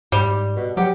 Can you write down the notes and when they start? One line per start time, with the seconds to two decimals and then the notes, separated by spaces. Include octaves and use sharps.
0.12 G#2 G3
0.56 B2
0.77 F#3 G4 F#5